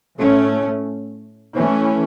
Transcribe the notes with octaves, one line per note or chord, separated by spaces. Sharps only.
A2 A3 C#4
E3 A3 C#4